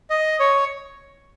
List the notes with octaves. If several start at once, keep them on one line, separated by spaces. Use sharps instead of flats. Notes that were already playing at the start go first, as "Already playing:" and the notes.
D#5
C#5